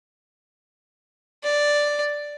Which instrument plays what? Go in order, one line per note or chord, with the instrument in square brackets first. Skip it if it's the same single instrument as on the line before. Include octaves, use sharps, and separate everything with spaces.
[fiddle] D5